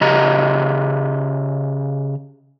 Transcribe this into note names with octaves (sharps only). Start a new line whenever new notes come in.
C#3 G4 D#5 A#5